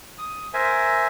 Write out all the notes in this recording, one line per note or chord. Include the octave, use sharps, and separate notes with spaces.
D#6
A#4 C5 E5 G#5